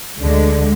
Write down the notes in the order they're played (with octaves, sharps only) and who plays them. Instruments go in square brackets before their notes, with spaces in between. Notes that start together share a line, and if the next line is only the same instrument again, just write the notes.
[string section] D2 D3 G#3